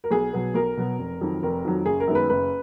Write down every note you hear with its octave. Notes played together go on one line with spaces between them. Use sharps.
A#4
B1 G#4
B2 F#3 B3
B1 A#4
B2 F#3 B3
F1
F2 D#3 F#3
F1 A#4
F2 D#3 F#3
F#1 G#4
A#4
F#2 D#3 G#3 B3
B4
F#1 B4